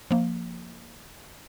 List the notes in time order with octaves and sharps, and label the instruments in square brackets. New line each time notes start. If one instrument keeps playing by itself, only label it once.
[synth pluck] F3 A#3